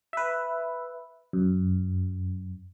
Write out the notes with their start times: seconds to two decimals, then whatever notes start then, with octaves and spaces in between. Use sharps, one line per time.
0.13 B4 E5
1.33 F#2